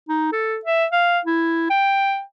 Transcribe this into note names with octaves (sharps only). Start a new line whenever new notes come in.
D#4
A4
E5
F5
E4
G5